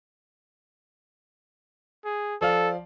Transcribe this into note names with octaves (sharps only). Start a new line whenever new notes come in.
G#4
F3 A4 D5 F5